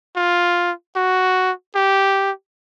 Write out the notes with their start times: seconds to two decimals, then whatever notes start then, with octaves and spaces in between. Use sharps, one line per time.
0.16 F4
0.96 F#4
1.75 G4